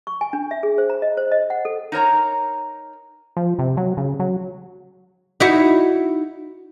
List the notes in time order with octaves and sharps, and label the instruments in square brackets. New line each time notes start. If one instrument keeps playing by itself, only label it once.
[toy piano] C#6
G#5
D4
E5
G#4
C5
A#5
D#5
C5
D#5
F#5
A4
[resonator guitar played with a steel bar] D#4 A#4 C#5 A#5
[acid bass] F3
C3
F#3
C#3
F#3
[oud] D#4 E4 F#4